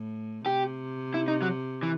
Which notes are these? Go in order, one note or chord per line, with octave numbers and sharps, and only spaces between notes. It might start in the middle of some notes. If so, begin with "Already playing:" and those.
Already playing: A2
C3 G4
E4
D#4
F#3
E3